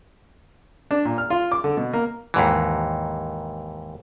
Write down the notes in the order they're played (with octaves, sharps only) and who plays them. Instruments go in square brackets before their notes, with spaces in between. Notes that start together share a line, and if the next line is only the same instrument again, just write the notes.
[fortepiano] D4
A#2
F6
F4
D6
D3
B2
A#3
[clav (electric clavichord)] D#2 G#2 E3